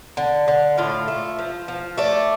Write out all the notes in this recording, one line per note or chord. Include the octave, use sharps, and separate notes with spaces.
D3
D3
A2 F4
A3
F3
F3
A3 D5